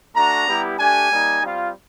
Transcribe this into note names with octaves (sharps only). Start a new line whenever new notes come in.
A3 D4 F#4 A#5
G3 B3 E4 G4
A3 D4 G4 G#5
G3 A#3 D#4
G3 C4 F4